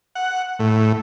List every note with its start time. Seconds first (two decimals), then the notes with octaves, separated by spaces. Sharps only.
0.15 F#5
0.59 A2